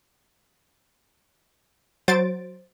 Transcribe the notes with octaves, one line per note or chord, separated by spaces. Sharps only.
F#3 C5 A6 D7